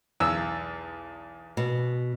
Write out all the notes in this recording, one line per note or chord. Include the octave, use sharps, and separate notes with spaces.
B1 E2 E6
B2